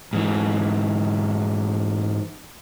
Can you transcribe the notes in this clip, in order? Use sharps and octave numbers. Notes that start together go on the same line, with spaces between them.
G#2 E3